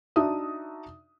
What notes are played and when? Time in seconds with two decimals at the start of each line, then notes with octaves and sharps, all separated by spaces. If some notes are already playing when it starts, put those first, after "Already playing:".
0.16 D4 D#4 F#4 D5 E5 D#6